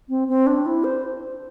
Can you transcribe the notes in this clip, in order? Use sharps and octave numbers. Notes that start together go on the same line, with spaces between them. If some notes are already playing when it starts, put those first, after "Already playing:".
C4
C4
D4
E4
C5